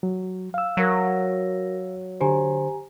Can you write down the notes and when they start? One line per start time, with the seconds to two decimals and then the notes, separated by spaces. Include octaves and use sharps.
0.03 F#3
0.54 F5 E6
0.77 F#3 F#4 A#4 A#6
2.21 D3 G4 C5 G#5 A#5